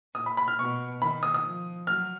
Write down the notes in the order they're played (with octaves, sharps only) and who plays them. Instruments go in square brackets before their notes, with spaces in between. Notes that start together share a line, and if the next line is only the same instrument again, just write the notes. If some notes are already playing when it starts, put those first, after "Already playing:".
[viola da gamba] A#2 [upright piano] D#6
[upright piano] B5
B5
F6
[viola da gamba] B2 [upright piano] C#6
[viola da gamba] D#3 [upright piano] B5
[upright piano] D#6
D#6
[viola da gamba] F3
[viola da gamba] F#3 [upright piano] F6